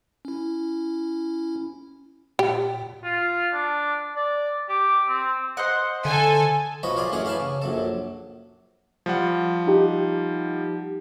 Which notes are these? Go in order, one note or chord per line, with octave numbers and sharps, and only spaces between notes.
C#4 E4
A#2 G4
F4
D4
D5
G4
C4
C5 D#5 F#5
D3 A4 G#5
B1 F3 F#4 B4 D#5 B5
F4 G4 G#4 D5
A1 F#2 C#4 G4 G#4 F#5
G4 B4 F5 G#5 A5
C#3
A#1 F#2 A4
F3 G3 F#5
D#4 G4